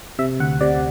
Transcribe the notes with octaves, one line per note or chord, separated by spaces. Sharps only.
C3 E5
D2 F#5
C3 D5